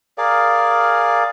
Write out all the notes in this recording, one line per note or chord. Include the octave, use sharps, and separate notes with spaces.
G#4 A#4 D5 F5